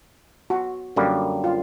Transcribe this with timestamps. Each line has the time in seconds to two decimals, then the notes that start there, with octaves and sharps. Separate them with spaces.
0.50 F#4
0.96 F#2 D3 G3 A#3
1.44 F4